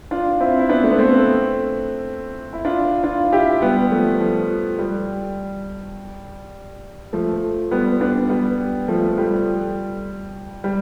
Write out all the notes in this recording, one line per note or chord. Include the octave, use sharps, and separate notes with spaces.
D4 F4
C4 E4
E4
B3 D4
A3
B3
A3 C4
E4
D4 F4
D4 F4
E4 G4
G3 B3
F3 A3
F3
G3
F3 A3
G3 B3
B3 D4
G3 B3
F3 A3
G3
G3